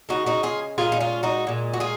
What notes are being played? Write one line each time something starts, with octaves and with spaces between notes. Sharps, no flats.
C#3 G#3 D#4 F#4
D#4 F#4
F4 G#4
A#2 G#3 F4 G#4
D#4
C#4 F4
D#4 F#4
A#2 G#3
F#4
F4 G#4